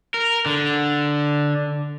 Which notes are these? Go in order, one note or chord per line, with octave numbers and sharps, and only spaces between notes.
A#4
D3